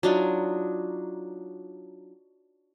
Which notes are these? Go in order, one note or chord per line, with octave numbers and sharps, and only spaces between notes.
F#3 D4 D#4 F4